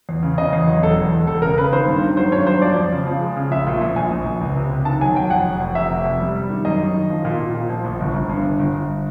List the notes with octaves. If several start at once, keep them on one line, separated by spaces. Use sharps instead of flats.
E2
C#3
C#3 D#5
E2
F#3
E1 A4
E2
E1
E1 A4
C#3 A#4
C#3 B4
D#3 C5
G2
D#3
F#3 C5
G2 C#5
F#3 C5
F3 D5
F2
C#3
F3
G#3
C#3
A#1 E5
A#2
A#1
A#1 G#5
A#1
A#1
C#2
C3
C#2
D#3 A5
F#3 G#5
F#3 G5
F2 F#5
F1
F2
F1 E5
C3
F2
G3
G3
D#3
F#2 D#5
D#3
D#3
F3
A#2
A#2
A#2
F3
A#1
G1
G1
G2
G1
G1
G1